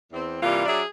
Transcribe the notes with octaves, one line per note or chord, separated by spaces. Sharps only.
E2 C4
C3 E3 G3 A#3 F4
F#3 D4 G#4 D5 E5